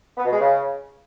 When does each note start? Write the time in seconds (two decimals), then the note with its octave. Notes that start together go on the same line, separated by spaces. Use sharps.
0.17 B3
0.25 B2
0.33 G#3
0.40 C#3